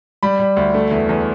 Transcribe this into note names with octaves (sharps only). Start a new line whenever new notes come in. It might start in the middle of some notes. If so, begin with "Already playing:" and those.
G3 B5
G3
D2
A3
E2
E2